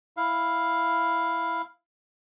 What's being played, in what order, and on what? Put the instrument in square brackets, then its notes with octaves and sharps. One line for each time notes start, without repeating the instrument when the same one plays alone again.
[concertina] E4 F5